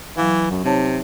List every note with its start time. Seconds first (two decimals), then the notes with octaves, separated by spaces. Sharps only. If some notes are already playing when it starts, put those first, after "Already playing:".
0.17 E3 F#3 F5
0.51 F#2
0.65 C3 D#4 C#5 A5